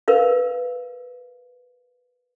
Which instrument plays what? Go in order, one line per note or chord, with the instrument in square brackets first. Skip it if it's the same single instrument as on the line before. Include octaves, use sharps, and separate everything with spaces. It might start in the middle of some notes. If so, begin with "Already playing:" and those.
[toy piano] A#4 B4 F5